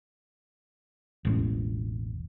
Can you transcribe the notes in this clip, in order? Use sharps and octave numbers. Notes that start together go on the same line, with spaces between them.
E1 A1